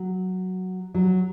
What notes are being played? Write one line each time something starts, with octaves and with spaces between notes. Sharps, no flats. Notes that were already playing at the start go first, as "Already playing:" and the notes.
Already playing: F#3
F#3